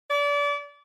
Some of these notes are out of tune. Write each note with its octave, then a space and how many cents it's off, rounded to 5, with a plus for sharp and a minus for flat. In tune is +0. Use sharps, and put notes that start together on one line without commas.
D5 -30